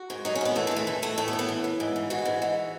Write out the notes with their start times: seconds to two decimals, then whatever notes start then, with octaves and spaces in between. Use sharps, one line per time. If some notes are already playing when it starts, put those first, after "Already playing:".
Already playing: F#4
0.10 G#2
0.25 F#3 D#4
0.35 C#4
0.41 G#2 B3
0.56 E3 A3
0.67 G#3
0.71 E3
0.76 A3
0.87 E3
1.02 E3 A3
1.18 A2 A3
1.28 B3
1.33 A2
1.39 B3
1.48 E3
1.64 E3
1.80 G#2
1.96 E3
2.10 E3 F#4
2.25 G#2
2.42 E3